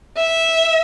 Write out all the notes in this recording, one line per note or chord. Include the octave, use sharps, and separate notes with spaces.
E5